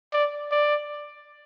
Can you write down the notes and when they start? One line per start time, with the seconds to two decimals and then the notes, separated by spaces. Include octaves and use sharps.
0.13 D5
0.51 D5